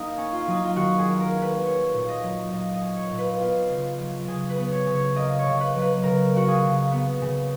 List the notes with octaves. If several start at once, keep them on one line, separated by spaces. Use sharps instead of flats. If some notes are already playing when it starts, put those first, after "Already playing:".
Already playing: A#3 D#4
C#4
F4
F#3 D#4
F4
D#3 F#4
G#4
A#3
A#4
C#4
B4
C#4 C#5
A#2
D#5
F#3
A#2 D#5
D#5
C#4
C#5
A#2
B4
B3 F4
C#3
F#3
C#3 G#4
B4
B3
C#5
C#3
C#5
A#3 D#5
C#5
C#3
B4
F#3
B4
C#3 A#4
A#3 F#4
G#4
C#3
B3
C#3